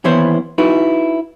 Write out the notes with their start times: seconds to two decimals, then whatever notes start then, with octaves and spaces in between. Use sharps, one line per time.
0.04 D#2 E3 B3 E4 C5 C#5
0.58 D#4 E4 F#4 B4